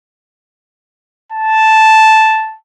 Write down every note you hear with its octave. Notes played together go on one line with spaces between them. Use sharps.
A5